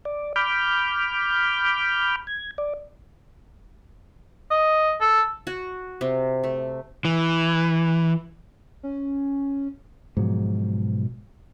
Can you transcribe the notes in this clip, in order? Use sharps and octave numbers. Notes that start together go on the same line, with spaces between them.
D5
B5 D6 F6 G6
G#6
D5
D#5
A4
F#4
C3
A3
E3
C#4
G#2 B2 F3 F#3